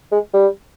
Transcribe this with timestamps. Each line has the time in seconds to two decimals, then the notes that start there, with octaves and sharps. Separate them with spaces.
0.12 G#3
0.34 G3